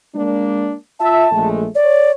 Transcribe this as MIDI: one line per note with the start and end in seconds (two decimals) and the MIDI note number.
0.14 0.74 56
0.14 0.74 58
0.14 0.74 62
1.00 1.25 65
1.00 1.25 76
1.00 1.48 81
1.31 1.66 34
1.31 1.66 56
1.31 1.66 57
1.75 2.14 73
1.75 2.11 74